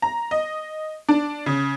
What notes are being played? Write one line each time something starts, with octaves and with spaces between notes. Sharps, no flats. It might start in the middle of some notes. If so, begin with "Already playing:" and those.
A#5
D#5
D4
C#3